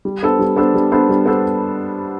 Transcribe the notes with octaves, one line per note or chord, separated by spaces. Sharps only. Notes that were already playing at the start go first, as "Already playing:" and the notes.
G3
B3 D4 A4 C5
G3
B3 D4 A4 C5
G3
B3 D4 A4 C5
G3
B3 D4 A4 C5